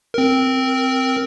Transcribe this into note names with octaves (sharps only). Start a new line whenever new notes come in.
C4 A#4